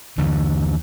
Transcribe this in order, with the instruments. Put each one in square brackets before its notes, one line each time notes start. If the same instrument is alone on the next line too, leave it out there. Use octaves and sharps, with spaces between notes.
[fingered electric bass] D#2 D3 E3